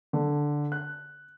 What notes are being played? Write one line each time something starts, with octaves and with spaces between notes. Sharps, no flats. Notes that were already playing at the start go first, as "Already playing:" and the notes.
D3
F#6